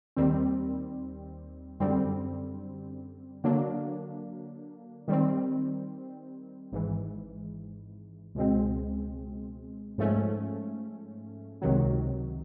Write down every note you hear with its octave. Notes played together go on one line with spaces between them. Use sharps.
D#2 D#3 G3 C4
F#2 D3 G3 C4
D3 F#3 A#3 D4
D#3 G3 C4
G#1 G#2 E3
C#2 B2 G#3 C4
G#2 F3 A3 C#4
C#2 C3 D#3 F#3